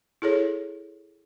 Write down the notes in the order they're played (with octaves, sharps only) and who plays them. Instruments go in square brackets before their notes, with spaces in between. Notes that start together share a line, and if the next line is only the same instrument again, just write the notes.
[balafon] E4 G#4 A4 C#5